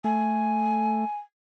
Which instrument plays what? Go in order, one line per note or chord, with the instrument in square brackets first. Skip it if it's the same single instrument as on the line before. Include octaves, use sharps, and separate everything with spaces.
[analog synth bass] A3 [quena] G#5